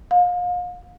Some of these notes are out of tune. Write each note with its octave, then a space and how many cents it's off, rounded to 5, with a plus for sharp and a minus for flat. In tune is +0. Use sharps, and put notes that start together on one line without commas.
F5 +35